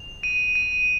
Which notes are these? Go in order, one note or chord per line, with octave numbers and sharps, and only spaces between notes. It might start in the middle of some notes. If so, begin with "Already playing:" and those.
Already playing: F7
D#7
D#7